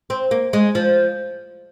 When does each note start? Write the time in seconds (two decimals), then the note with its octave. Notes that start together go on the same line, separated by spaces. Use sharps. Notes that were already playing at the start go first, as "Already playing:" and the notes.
0.10 C4
0.31 A#3
0.53 G#3
0.75 F3